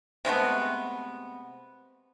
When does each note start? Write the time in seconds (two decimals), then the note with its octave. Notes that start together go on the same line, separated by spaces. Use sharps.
0.25 C3 G#3 A3 B3